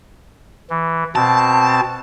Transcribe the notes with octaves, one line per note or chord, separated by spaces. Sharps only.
E3
B2 C4 A5